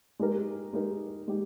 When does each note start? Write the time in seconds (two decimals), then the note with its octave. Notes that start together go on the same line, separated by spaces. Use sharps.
0.19 G#3 D#4 G4 A#4
0.73 G#3 D#4 G4 A#4
1.28 G#3 D#4 G4